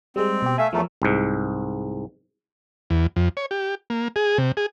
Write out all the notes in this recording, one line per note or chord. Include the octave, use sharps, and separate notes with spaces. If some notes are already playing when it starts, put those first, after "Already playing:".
G3 G#3 C4
B2 G4
A3 E5 F5 G#5
E2 F3 A3 A#4 C#5
C2 G#2
E2
F2
C#5
G4
A#3
G#4
C3
G#4